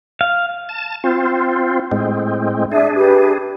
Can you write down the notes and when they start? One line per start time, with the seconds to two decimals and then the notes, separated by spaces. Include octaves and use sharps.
0.21 F5
0.69 A5
1.04 C4 F4
1.91 A2 G#3 C4
2.72 D4 G#4 D5 E5
2.96 G4 B4